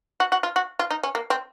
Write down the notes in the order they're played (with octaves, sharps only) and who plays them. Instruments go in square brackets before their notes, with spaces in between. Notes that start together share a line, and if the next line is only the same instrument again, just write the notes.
[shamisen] F#4
F#4
F4
F#4
F4
D#4
C#4
A#3
C4